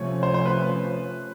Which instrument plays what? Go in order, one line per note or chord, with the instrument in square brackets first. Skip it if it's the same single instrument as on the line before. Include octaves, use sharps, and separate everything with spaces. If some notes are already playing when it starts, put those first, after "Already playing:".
Already playing: [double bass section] C3 F3 A3 C#4 [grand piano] C#5
[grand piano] C5
C5
B4